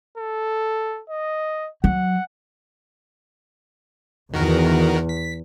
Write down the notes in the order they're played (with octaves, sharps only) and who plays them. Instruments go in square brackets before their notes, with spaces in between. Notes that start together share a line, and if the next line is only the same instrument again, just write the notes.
[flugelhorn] A4
D#5
[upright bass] F#3 [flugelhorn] F#5
[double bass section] E2 [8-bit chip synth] D#3 F#4 A#4
[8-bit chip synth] B6